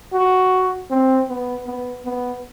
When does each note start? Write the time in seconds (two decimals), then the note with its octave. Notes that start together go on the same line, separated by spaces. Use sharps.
0.13 F#4
0.90 C4
1.29 B3
1.67 B3
2.05 B3